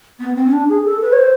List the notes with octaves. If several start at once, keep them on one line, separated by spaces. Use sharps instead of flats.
B3
C4
C#4
D4
G#4
A4
B4
C#5
C5